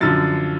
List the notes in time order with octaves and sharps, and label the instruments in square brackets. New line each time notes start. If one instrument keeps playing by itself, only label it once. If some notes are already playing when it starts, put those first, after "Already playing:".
[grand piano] F#2 D3 F3 A6